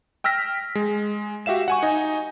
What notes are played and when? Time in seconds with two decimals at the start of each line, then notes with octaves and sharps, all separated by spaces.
0.24 G5 E6 F6 A#6 B6
0.75 G#3
1.46 F#4 G4 E5 F5 E7
1.68 F#5 G#5 C#6
1.83 D#4 D#5 G#5